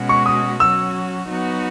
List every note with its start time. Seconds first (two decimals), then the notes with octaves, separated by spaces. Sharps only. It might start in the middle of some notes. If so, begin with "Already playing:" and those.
Already playing: B2 G#3 C#4 F#4
0.09 C#6
0.26 D#6
0.60 F#3 C#4 F#4 E6
1.27 F#3 B3 D#4 F#4